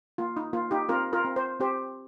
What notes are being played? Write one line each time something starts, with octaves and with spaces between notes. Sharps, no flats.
A#3 F4
D#4
A#3 F4
D#4 G4
C4 F4 A#4
F4 A#4
C4
C5
C4 G4 C5